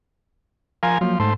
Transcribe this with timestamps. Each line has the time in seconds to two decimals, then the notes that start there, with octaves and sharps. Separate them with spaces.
0.83 F3 A#4 F5 G#5
1.01 F3 F#3 A#3
1.20 G#2 A3 C5